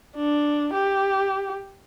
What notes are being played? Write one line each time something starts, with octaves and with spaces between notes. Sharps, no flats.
D4
G4